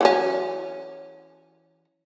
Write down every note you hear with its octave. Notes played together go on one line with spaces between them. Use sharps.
E3 F#3 C#4